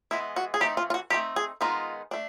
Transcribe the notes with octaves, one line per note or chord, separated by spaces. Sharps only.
E3 G#3 B3 E4
F#4
G#4
E3 A3 C4 D#4 G4
F4
F4
F#4
A3 C4 D#4 G4
G#4
D#3 G#3 B3 D#4 F4
A3 D4